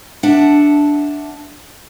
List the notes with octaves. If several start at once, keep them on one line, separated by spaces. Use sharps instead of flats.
D4 E5 F#5 A5